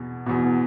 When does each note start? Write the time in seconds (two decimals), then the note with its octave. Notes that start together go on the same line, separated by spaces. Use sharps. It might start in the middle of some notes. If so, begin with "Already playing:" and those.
Already playing: E2 B2
0.26 E2 B2